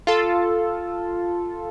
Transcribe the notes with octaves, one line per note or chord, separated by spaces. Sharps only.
F4 A4